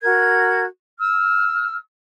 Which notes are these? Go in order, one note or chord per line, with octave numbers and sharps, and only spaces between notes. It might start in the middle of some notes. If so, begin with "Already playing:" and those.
F#4 A#4 G#6
E6 F6